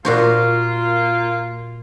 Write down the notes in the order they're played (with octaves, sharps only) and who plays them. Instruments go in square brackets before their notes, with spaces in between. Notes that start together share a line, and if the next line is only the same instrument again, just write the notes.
[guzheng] A#2 F#4 C5 [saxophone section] A#3 F4